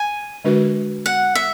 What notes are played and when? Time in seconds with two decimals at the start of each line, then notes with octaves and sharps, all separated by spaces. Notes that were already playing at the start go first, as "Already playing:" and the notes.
Already playing: G#5
0.44 D3 G#3 D4 F#4 B4
1.06 F#5
1.35 E5